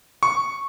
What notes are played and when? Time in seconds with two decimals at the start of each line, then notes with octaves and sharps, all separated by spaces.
0.23 C#6